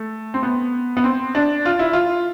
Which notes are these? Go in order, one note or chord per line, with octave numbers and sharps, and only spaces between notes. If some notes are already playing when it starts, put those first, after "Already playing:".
Already playing: A3
C4
B3
B3
C4
D4
F4
E4
F4